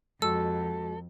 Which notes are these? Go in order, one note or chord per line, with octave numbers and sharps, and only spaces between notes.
F2 G#3 F#4 A4 E6